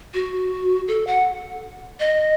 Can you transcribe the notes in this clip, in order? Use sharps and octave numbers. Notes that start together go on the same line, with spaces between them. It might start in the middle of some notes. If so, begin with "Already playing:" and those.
F#4
A4
F#5
D#5